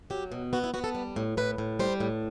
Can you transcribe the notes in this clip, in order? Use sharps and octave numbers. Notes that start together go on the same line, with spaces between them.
F#3 G4
B2
B3 F#4
E4
B3 F#4
A4
G3
A2
A2 B4
A2
G3 C5
A2